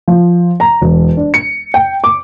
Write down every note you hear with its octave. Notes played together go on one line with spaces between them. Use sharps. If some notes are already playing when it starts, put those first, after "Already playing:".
F3
A#5
E1
D4
C#7
G5
D6